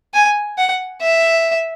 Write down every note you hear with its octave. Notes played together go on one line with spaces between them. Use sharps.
G#5
F#5
E5